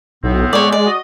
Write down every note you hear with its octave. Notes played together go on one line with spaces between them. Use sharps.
B1 A2 B3 C4
G#3 C#5 D5
D5
F#4 D#5